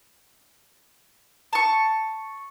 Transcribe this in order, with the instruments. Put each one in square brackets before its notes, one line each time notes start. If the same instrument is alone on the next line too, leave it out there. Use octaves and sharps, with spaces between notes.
[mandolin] A5 C#6